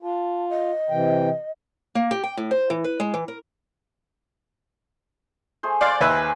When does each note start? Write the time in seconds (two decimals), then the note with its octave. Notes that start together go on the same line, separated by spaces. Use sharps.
0.02 F4 A5
0.49 D#5
0.90 C3 E3 G5
1.95 A#3
2.11 G4
2.23 G5
2.37 A2
2.51 C5
2.70 E3
2.84 B4
3.00 G#3
3.14 E3
3.28 A#4
5.63 A3 G#4 C5
5.81 C5 D5 F5 F#5 C6
6.01 D#2 B4 E5
6.17 G#5